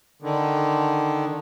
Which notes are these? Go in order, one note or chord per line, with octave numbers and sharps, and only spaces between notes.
D3 D#3